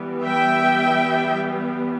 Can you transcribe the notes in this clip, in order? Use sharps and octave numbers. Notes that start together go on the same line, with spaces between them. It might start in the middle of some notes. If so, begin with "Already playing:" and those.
Already playing: E3 G3 B3
E5 G5